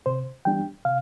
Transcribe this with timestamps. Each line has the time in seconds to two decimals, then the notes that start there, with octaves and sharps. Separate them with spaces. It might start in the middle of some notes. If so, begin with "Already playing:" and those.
0.06 C3 C5
0.45 E3 G3 B3 D4 G5
0.85 C3 F5